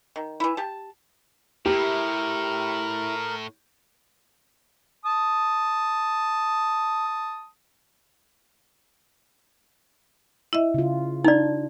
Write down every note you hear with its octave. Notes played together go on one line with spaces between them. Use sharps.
D#3
E3 E4
G4 A5
A2 E4 G4 A#4
A5 D#6
E4 D#5 E5
C#3 F4
D4 D#4 D5 A#5